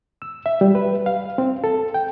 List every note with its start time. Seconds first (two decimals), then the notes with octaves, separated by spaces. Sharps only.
0.22 E6
0.46 E5
0.61 G3
0.75 B4
1.06 F5
1.38 C4
1.64 A4
1.94 G5